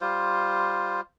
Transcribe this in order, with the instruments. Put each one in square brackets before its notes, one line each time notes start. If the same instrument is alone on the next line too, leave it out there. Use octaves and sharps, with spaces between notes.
[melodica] G3 F4 C5